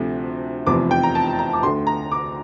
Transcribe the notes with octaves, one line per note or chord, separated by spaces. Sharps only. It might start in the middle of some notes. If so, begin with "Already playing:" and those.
Already playing: D2 C3 F3 A3
F1 E2 C3 F3 D6
G5
A#5
A5
A#5
D6
D2 D3 A3 C6
A#5
D6